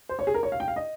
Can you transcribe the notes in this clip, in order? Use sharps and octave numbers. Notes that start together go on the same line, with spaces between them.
C5
C#5
G#4
A#4
C#5
F5
G5
F5
D#5